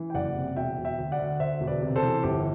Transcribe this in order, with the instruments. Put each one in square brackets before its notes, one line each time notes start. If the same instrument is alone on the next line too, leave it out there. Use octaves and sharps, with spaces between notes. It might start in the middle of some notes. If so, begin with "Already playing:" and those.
Already playing: [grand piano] E3
G5
F#1 D5 F#5
C3
E1 E5 G5
E1
E5 G5
D2
D5 F#5
D2
D2 C5 E5
E1
B4 D5
C3
A4 C5
E3
G1 G4